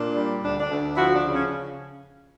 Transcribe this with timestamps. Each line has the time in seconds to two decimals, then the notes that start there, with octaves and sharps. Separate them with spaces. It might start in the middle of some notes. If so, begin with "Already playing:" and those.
Already playing: A#2 D4
0.17 G3
0.43 D2 D4
0.60 D4
0.70 D2
0.96 F3 E4 F#4
1.13 D4
1.23 C#3
1.32 C#4